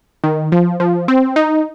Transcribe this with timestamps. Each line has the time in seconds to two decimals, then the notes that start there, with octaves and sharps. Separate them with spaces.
0.24 D#3
0.52 F3
0.80 F3
1.08 C4
1.36 D#4